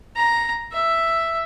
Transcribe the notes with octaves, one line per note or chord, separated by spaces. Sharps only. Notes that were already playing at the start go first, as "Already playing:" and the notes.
A#5
E5